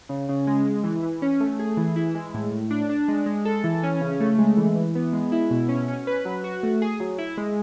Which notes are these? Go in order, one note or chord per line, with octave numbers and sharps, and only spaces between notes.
C#3
C#3
G#3
G#3
E3
E3
C#4
A3
G#4
E3
E4
G#3
A2
A2
D4
D4
G#3
G#3
A4
E3
C#4
C#3
A3
G#3
E3
E3
B3
G#3
E4
B2
C#4
C#4
B4
F#3
F#4
A3
G#4
F#3
E4
G#3